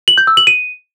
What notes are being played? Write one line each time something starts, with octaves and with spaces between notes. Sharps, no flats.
F#7
G6
E6
F#7
D#7